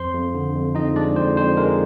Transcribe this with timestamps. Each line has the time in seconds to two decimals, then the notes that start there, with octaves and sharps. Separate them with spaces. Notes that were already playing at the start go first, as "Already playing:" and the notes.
Already playing: F2 C5 C6
0.13 F2
0.34 D3
0.55 F2
0.75 F2 D#4 D#5
0.96 G#3 D4 D5
1.16 F2 C5
1.37 F2 C5
1.57 G#3 A#4